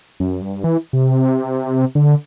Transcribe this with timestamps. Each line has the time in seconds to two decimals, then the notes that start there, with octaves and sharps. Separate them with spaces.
0.20 F#2
0.42 G2
0.64 E3
0.93 C3
1.95 D3